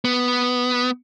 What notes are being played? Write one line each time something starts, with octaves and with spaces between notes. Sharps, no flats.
B3